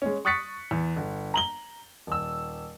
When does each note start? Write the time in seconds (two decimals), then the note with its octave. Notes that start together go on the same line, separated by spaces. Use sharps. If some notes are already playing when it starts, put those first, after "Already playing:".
0.02 G#3 C#4
0.25 C#6 D#6 F#6 A6 B6 C#7
0.71 E2
0.96 G1
1.34 A#5 F#7 G7
2.07 D#1 E6